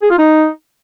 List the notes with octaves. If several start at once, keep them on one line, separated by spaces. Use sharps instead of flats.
G#4
F4
D#4